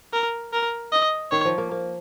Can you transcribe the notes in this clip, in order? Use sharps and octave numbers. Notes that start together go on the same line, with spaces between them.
A#4
A#4
D#5
D#3 C#5
F3
A#3
A#3